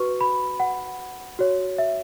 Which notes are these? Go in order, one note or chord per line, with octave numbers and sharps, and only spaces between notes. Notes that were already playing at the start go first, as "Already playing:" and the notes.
Already playing: F#4 B4 C#6
B5
F#5
F#4 C#5
E5